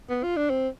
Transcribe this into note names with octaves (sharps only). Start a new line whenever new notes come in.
B3
F4
D4
C4